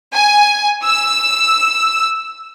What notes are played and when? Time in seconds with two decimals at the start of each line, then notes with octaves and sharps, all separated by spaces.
0.12 G#5
0.83 E6